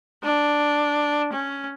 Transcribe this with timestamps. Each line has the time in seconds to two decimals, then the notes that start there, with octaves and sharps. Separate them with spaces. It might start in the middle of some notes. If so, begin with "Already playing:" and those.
0.24 D4
1.33 C#4